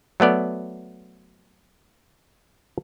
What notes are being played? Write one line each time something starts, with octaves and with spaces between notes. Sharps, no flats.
F#3 A3 B3 D5